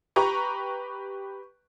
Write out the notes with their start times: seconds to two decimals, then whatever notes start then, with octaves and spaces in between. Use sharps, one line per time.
0.16 G4 B4 A#5 C#6